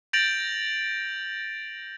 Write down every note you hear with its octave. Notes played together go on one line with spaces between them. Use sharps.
G6 A6 A#6 D7 F7 F#7